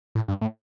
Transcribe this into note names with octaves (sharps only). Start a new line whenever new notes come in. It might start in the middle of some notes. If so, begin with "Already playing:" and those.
A2
G2
A2